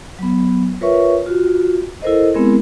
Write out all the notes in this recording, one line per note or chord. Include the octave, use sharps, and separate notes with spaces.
F#3 B3
F4 A#4 B4 C#5 E5 C#6
F4 F#4
E4 A4 A#4 C5 D#5
G#3 B3 C4 E4 G#4 A#4